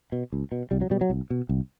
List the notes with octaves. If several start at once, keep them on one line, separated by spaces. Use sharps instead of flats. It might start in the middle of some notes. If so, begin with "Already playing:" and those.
B2
C#2
B2
C2 G3
F#3
B2 G3
F#3
C2
B2
C2